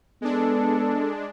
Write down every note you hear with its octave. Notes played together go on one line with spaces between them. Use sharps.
G#3 B3 D4 A4